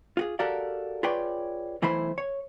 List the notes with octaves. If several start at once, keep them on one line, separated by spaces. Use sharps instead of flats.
F4 F#4 G#4
F#4 G4 A4 A#4 D5 F5
F4 G#4 B4 C#5 D5 G5
B1 E3 A3 E4 C5 B5
C#5